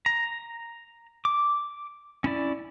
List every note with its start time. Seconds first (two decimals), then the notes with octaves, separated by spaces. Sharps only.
0.06 A#5
1.25 D6
2.24 C#4 E4 D5